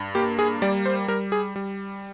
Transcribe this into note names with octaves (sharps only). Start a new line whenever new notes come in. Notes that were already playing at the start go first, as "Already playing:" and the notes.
Already playing: G2
A#3 G4
G#4
G3 D5
C5
G3 A#4
G#4
G3